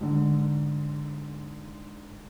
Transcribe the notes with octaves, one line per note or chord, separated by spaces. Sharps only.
G#2 D3